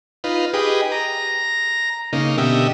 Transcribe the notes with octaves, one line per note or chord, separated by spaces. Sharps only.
D#4 F4 B4
G4 G#4 B4 D#5
A#5
C#3 A#3 D#4
B2 D3 G4 D#5 E5